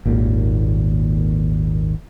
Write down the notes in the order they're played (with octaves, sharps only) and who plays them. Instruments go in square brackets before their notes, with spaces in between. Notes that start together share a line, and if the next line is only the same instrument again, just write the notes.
[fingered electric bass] G#1 D#2 A#2